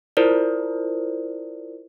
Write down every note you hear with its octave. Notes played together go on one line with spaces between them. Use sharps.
E4 F4 A#4 C5 D5